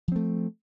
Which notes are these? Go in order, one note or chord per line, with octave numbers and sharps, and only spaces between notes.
F3 A3 C4